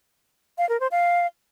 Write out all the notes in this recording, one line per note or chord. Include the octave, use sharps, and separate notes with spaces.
F5
A#4
C5
F5